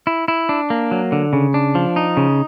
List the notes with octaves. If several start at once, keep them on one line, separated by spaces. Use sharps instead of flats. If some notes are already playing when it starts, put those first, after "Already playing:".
E4
E4
D4
A#3
F#3
D3
C#3
D4
F3
D#4
C#3